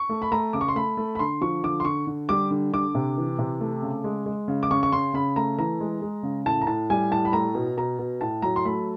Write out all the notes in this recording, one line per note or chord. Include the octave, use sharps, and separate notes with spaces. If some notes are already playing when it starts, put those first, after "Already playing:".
Already playing: C#6
A3
B5
A3 A#5
C#3 D6
C#6
C6
A3 B5
A3
B5
D3 C6
F3 C#6
D3 D6
C6
D3 C#6
D3
G3 D6
D3
D3 D6
C3
E3
C3
A3
C#3
G#3
G#3
C#3
D6
C#3 C#6
C#6
C#3 C6
C#3 B5
A3 A#5
E3 A#5
G#3
G#3
C#3
A2 A5
A#5
A2 A5
G3 G#5
A2 A5
B5
A3 A#5
B2
B2 A#5
B2
A2 A5
F#3 A#5
C6
A3 B5